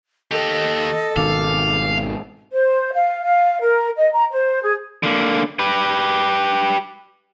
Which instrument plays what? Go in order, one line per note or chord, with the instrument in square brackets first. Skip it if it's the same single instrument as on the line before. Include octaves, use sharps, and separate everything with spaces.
[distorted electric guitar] D#2 G4 [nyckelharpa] A4 [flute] D#5
[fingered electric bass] G#1 B2 D#3 [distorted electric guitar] F5 [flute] D6
[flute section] C5
F5
F5
A#4
D#5
A#5
C5
G#4
[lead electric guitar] D3 A#3
G4 B4